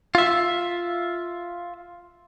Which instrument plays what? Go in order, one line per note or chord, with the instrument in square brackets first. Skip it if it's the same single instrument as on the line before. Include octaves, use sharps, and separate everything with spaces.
[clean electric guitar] F4 E5